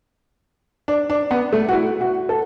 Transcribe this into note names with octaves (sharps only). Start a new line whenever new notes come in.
D4
D4
B3
A3
F#4
E4
F#4
A4